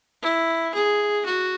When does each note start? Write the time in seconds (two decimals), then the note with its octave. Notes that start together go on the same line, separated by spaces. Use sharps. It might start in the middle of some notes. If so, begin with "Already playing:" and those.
0.22 E4
0.74 G#4
1.25 F#4